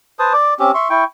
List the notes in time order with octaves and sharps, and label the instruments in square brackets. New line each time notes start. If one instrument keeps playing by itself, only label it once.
[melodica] B4 C5 A5 D#6
D5 D6
C4 C#4 G4
E5 C6 C#6
E4 G5 C#6